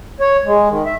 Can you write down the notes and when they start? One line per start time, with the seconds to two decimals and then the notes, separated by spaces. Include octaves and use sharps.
0.20 C#5
0.45 G#3
0.69 D#3
0.86 E5